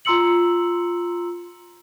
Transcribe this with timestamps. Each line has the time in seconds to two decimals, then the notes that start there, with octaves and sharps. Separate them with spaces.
0.05 F4 A#5 C6 E6 C#7 F#7